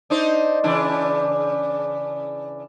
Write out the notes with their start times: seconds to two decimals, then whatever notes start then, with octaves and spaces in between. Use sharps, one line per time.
0.10 D4 D#4 C5
0.64 C#3 E3 D4